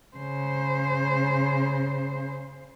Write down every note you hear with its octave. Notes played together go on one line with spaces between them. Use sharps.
C#3 C5